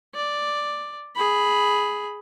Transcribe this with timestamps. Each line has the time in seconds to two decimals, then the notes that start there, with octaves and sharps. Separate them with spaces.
0.15 D5
1.16 G#4 B5